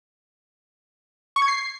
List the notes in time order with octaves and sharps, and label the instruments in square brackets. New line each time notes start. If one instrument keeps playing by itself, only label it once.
[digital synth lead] C#6
G#6
C7